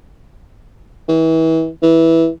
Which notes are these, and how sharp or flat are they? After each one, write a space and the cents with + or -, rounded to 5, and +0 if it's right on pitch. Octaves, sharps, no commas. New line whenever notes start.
E3 -30
E3 -10